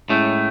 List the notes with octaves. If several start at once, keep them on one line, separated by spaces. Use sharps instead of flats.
A2 G#3 A3 C#4 E4 G#4